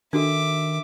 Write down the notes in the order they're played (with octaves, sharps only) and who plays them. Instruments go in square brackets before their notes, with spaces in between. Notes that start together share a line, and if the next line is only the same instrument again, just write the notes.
[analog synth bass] D#3 [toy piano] D4 F#4 A4 [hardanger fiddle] E5 D6